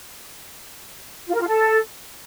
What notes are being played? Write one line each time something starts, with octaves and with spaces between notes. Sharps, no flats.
F4
A#4
F4
A4